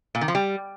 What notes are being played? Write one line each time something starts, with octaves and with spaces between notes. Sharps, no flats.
A#2
D#3
F3
G3